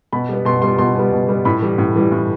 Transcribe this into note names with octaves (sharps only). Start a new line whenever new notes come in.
B2 B5
G3 B3
B2 C6
G3 B3 C6
B2 C6
G3 B3
B2
G3 B3
A2 B5
E3 G3
A2
E3 G3
A2